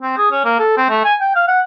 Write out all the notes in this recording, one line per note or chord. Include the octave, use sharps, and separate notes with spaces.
C4
G#4
C#4
A#3
A4
C4
A3
G#5
G5
F5
F#5